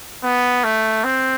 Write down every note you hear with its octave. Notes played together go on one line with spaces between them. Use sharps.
B3
A3
C4